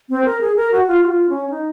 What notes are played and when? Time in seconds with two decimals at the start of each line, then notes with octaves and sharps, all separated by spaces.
0.10 C4
0.25 A#4
0.41 G#4
0.56 A#4
0.72 F#4
0.87 F4
1.03 F#4
1.08 F4
1.29 C#4
1.50 D#4